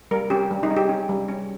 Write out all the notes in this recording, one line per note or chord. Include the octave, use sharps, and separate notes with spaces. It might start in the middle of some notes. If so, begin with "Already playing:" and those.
G3 A#4
C#4 G4
G3
D#4
C#4
G4
C#4
G3
C#4